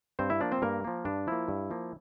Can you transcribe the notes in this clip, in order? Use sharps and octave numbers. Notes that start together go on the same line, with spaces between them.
G2 C4 C5
E4 E5
F3 A#3 D4 D5
C4 C5
G2 A#3 A#4
F3 A#3
G2 D4
F3 A#3 E4
G2
F3 A#3